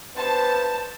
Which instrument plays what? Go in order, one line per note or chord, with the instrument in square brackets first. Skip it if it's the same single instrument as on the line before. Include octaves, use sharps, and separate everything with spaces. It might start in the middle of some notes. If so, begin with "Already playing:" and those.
[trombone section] G2 B3 C5 [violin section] A5